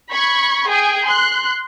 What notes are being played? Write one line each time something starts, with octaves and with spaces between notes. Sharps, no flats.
B5 C#6 G#6
G#4 G5 G#5
C6 F#6